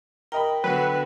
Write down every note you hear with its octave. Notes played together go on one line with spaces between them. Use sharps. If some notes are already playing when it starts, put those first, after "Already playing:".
A#4 D#5 G5 B5
D3 F#3 B3 F#4 B4